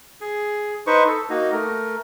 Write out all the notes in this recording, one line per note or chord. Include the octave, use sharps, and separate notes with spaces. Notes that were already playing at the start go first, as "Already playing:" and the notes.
G#4
D#4 B4 C5 C#6
A4
A#3 D#4 F#4
A3 A#4